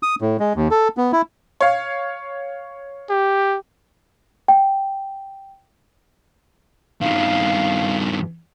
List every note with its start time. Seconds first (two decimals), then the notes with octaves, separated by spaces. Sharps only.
0.03 D#6
0.21 A2
0.40 G#3
0.56 D#2
0.71 A4
0.97 B3
1.12 E4
1.61 C#5 F5
3.10 G4
4.48 G5
7.01 G2 D#3 F5